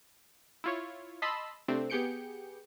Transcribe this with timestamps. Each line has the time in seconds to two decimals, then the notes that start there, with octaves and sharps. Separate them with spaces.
0.64 E4 F4 C#5
1.22 D#5 A5 B5 C6 E6
1.68 C3 A3 C4 D4
1.90 B3 G4 G#4 G6 C#7 D7